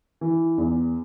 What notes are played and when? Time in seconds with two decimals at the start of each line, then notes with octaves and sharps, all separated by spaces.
0.21 E3
0.58 E2